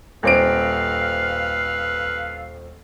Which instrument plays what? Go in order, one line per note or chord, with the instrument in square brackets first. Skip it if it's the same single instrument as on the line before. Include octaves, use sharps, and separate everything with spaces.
[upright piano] D#1 C4 D7 [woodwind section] A4 B4 F5